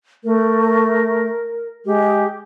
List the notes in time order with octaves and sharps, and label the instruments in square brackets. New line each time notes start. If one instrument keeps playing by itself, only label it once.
[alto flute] A3 [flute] A#4
[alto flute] G#3 [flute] G4